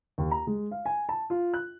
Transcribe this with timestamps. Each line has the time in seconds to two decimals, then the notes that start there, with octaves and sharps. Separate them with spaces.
0.18 D#2
0.31 A#5
0.47 G#3
0.71 F5
0.86 G#5
1.09 A5
1.30 F4
1.54 F#6